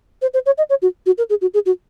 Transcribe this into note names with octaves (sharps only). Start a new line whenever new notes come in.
C5
C5
C#5
D#5
C#5
F#4
F#4
A#4
G#4
F#4
G#4
F#4